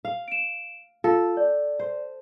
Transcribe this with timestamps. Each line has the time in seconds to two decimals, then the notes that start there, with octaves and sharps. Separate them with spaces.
0.05 F5
0.28 D7 E7
1.04 F4 A4 F5
1.37 D5
1.79 C5